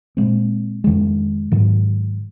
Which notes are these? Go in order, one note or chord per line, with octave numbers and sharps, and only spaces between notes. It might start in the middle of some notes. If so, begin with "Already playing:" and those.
A#2 G#3 C4
F2 D#3 G#3
G#2 D#3 F#3